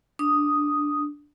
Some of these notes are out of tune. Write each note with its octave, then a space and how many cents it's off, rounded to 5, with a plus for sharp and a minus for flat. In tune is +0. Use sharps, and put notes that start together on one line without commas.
D4 +0 D#6 +0